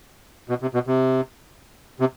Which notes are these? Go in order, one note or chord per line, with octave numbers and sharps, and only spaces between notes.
B2
C3
B2
C3
C3